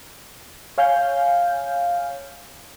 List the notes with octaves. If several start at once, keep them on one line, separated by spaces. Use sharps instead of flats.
C#5 F5 G#5 F6 G6